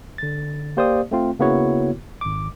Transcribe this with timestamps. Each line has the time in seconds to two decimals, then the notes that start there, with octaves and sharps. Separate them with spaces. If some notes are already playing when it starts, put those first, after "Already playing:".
0.18 D3 A6
0.77 A#3 G4 C5 D5 F5 D#6
1.11 A3 C4 F4
1.39 C#3 A#3 B3 E4 F#4 C#5
2.21 G#1 D6